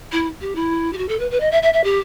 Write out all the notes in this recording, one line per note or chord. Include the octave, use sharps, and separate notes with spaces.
E4
G4
E4
G4
F#4
A4
B4
B4
D#5
E5
E5
E5
G4